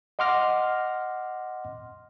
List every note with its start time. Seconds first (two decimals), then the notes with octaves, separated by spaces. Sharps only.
0.19 D#5 F#5 C6 D6 F6 A#6